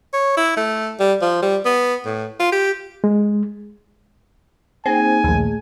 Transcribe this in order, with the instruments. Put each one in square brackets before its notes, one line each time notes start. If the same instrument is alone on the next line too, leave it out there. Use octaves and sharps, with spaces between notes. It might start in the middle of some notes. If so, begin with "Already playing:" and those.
[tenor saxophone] C#5
E4
A3
G3
F3
G3
B3
A2
F4
G4
[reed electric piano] G#3
[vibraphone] A#3 D#4 G#4 [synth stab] C4 [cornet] G#5
[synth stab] A#1 D#2 [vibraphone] A3 G#4